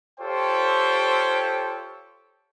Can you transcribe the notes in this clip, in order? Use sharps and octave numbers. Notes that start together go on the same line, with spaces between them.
F4 G4 A4 C5 C#5 G5